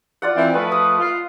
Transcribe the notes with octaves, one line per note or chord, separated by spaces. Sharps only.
F4 D5 F#5
E3 C4
F3 A3 B4 D#5
D#6
F4